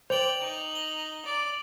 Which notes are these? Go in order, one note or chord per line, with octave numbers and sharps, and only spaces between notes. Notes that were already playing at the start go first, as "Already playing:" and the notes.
C5 D5 G5 F7 F#7
D#4
G7
D5